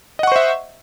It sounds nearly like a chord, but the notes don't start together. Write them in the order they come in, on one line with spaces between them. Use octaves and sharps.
D#5 F#5 C#6 C5 E5